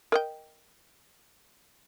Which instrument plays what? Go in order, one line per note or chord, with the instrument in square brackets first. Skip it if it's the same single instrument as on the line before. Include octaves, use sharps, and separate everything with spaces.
[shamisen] A#4 D#5 G5